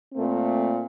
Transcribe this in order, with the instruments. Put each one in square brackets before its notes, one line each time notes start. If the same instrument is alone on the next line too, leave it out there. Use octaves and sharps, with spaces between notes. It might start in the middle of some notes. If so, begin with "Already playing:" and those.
[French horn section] A#2 A3 C4